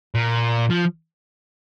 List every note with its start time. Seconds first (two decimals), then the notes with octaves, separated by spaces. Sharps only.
0.15 A#2
0.70 F3